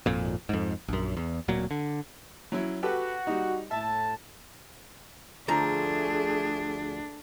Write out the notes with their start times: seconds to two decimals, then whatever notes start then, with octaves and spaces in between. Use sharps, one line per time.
0.06 G#1 F2 A#2
0.49 F2 G#2
0.88 A#1 F#2
1.17 E2
1.48 D1 A#2 F#3
1.71 D3
2.52 F#3 C#4 E4
2.83 F#4 G4 A4 B4
3.27 G3 D#4
3.71 A2 E5 A5
5.48 D2 F3 A3 D4 G#4 A#5